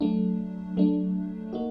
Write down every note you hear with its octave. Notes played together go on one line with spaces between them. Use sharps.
F#3 A3 D4
F#3 A3 D4
A#3 D#4 F#4